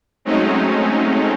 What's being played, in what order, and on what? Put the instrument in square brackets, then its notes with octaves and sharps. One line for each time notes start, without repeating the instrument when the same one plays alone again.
[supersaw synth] F#3 G#3 A3 C4 C#4 D#4